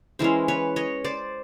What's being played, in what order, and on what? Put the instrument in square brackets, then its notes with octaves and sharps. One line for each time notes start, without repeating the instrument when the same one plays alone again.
[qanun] E3 G#3 C#4 A#4 C5
B4 C#5
C#5 D#5
C5 D5